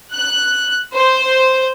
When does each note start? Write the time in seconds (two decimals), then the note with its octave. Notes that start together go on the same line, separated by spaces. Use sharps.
0.13 F#6
0.93 C5